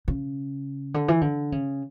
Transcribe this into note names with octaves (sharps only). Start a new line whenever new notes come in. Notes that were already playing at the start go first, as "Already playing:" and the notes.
C#3
D3
E3
D3
C#3